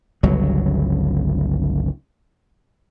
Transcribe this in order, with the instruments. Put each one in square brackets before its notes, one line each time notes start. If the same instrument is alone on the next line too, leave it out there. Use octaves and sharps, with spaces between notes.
[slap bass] G1 C#2 F#3